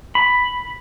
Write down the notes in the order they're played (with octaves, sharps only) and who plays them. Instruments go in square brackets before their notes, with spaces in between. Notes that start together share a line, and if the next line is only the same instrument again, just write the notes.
[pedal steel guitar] B5